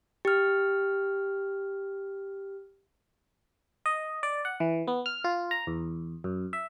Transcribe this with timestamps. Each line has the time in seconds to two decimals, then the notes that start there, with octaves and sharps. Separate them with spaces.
0.25 G4 F6
3.86 D#5
4.23 D5
4.45 F#5
4.60 E3
4.88 B3
5.06 F6
5.24 F4
5.51 A#5
5.67 E2
6.24 F#2
6.53 E5